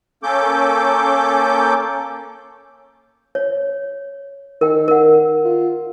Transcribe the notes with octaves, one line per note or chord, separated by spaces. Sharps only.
A#3 C#4 A4 D6 G6
C#5
D#3 A#4 G5
A#4 F#5
F4